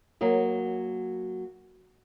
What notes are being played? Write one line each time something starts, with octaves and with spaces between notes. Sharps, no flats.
F#3 A#3 G#4